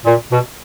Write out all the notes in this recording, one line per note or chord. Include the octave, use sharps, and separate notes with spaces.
A#2
B2